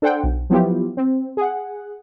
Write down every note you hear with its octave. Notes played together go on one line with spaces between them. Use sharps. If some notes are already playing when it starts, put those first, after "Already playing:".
D4 A4 C5 F#5 G5
B1
F3 F#3 B3 E4 F4 G4
C4
G#4 F#5